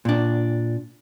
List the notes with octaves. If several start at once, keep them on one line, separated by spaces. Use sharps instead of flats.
A#2 D4